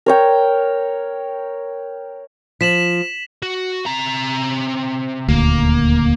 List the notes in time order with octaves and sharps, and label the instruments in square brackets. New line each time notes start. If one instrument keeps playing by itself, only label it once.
[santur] A#4 C#5 G5
[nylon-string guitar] F3 [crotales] B6 E7 F#7
[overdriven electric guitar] F#4
C3 A#5
[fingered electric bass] D#1 D2 [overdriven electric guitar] A#3